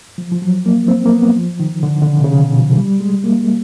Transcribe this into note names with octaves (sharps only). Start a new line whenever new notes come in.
F3
F3
F#3
A#3
C4
A#3
B3
F3
D#3
D3
D3
C#3
C3
C#3
B2
F3
G3
G#3
A#3